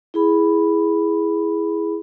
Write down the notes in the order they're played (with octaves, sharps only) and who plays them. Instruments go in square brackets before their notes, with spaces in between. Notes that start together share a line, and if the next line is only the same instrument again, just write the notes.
[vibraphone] E4 G#4 B5